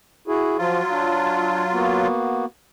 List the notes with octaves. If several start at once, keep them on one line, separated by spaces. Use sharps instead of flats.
E4 F#4 G#4
F3 F#3 F4
D4
A#3 B3 F#4